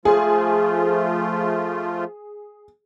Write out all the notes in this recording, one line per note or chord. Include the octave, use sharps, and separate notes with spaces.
F3 A3 F4 G#4